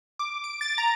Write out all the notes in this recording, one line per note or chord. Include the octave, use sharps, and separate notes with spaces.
D6
D7
A6
A#5